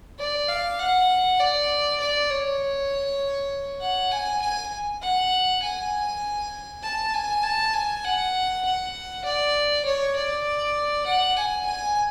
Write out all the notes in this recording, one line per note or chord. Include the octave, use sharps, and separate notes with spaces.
D5
F5
F#5
D5
D5
C#5
F#5
G#5
G#5
F#5
G#5
A5
G#5
A5
G#5
F#5
F#5
D5
C#5
D5
F#5
G#5
G#5